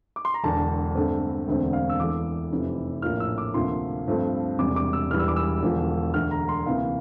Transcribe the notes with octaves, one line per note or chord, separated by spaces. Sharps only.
D6
C6
A#5
E1 E2 D3 A5
G2 D3 A3 C4
E1 D2 D3 A3 C4
F5
E6
E2 E3 A3 D6
F1 F2 C3 E3
A#1 A2 F3 A#3 F6
E6
D6
D2 C3 F3 A#3 C6
G2 F3 A3 C4
E1 E2 C3 G3 D6
D6
E6
E1 E2 E3 G3 F6
E6
D6
E6
E1 E2 D3 F3
E1 D2 D3 F6
A#5
C6
D2 C3 E3 A#3 F5